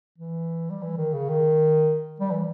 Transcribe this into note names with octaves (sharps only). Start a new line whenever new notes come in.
E3
G3
E3
D#3
C#3
D#3
G3
E3